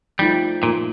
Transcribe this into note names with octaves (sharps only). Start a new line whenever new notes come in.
F3 G3 A3 D#4
A#2 F3 A3 D#4